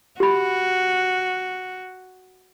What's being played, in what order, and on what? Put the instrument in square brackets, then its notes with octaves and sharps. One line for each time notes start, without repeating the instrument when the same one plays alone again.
[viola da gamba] F#4 [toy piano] G4 B5